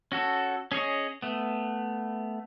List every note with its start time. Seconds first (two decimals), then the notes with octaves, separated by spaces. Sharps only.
0.12 C#4 F#4 A4
0.72 C#4 G#4 C#5 D#5
1.22 A3 B3